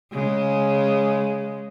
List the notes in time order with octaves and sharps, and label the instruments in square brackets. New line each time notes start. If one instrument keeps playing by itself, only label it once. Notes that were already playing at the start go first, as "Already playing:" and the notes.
[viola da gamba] C#3 G#3